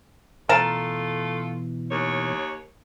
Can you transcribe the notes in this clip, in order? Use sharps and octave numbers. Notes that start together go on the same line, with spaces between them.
B2 E3 A3 F4 A4 A#4 A5
D#2 C#5